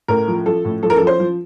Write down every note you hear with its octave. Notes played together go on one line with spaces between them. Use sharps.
A2 A#4
F3
F3 A4
A2
F3 A4
A#4
A4
F3
C5
F3